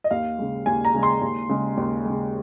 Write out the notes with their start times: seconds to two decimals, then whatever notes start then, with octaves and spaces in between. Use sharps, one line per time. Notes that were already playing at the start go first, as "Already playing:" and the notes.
0.04 D#5
0.11 D#2 F5
0.39 C#3 G#3
0.66 D#2 G#5
0.85 A#5
0.94 C#3 G#3
1.03 C6
1.21 D#2
1.49 C#3 G#3
1.77 D#2
2.05 C#3 G#3